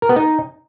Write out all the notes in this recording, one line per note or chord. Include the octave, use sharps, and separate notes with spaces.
A#4
B3
D#4